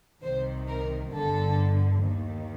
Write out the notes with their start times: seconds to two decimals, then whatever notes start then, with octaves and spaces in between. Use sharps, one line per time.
0.22 C2 C3 D#3 C5
0.68 A#4
1.13 G1 G2 D3 A4
2.03 D#2 D#3